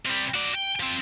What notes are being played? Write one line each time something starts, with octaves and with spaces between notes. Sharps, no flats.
C3 G3
F#4 D5
G5
F3 C4